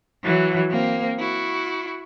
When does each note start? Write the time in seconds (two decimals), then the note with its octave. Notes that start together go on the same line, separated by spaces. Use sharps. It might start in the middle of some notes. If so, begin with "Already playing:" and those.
0.24 E3 F#3
0.71 A#3 C4
1.19 E4 F#4